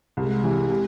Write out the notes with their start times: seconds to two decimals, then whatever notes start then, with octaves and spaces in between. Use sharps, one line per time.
0.17 C2 G#3 G#4
0.43 C3 E3
0.70 C3